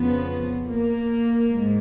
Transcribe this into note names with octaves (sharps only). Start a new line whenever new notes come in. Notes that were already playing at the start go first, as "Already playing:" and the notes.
Already playing: F2 C#3 F3 B3
A#3
G#2